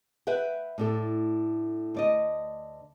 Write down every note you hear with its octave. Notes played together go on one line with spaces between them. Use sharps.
B4 E5 F#5 G5
A2 D4 A4
D2 D5 D#5